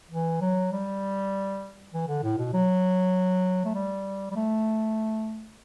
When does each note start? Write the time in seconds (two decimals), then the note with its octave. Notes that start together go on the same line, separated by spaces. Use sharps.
0.11 E3
0.41 F#3
0.72 G3
1.93 E3
2.08 D3
2.23 A2
2.38 B2
2.53 F#3
3.65 A3
3.75 G3
4.31 G3
4.36 A3